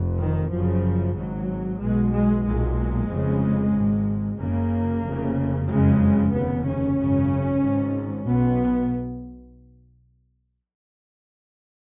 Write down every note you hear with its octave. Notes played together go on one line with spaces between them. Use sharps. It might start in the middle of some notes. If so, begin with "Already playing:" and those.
Already playing: F1 F2
D#3
F#1 F#2 C#3 F3
G#1 G#2 F#3
B1 B2 G#3
G#3
B1 A#2 G#3
F1 F2 C#3
G#1 G#2
F#1 F#2 C#3 A#3
F1 F2 C#3
F#1 F2 C#3 G#3
F1 D#2 C#3 B3
C#4
G#1 F#2 C#3
G#1 G#2
B1 B2 B3